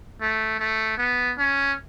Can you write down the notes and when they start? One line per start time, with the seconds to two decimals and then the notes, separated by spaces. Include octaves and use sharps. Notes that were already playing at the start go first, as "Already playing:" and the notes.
0.21 A3
0.59 A3
0.98 B3
1.38 C#4